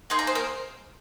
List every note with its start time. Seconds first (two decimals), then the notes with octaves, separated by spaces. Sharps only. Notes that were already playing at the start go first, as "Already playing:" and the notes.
0.10 A#3 D#4 G#4 C6
0.19 A#5
0.27 C5
0.35 A#4